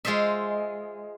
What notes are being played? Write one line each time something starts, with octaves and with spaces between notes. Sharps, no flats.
G#3 F4 C5 D#5 E5